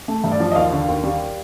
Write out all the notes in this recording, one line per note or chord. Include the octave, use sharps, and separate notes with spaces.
A3
G2
D5
F3
D#5
D#2 F5
D3
D#2
G3